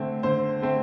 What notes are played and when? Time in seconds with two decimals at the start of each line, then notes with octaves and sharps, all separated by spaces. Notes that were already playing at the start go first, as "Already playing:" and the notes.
Already playing: D3 A3 C4
0.23 D3 C5
0.62 A3 C4